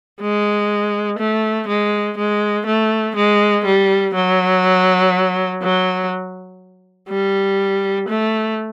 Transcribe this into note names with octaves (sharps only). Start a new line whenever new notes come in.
G#3
A3
G#3
G#3
A3
G#3
G3
F#3
F#3
G3
A3